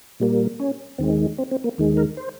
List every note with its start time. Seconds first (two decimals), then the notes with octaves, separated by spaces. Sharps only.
0.20 A#2 G3 A#3
0.60 C#4
0.98 D#2 D#3 G#3 C4
1.38 C4
1.51 C4
1.64 A#3
1.78 D#2 D#3 G#3
1.97 A#4
2.17 C5